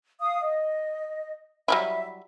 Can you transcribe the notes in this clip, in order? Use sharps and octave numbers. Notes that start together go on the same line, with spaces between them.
F5 D#6
D#5
F#3 G3 E4 E5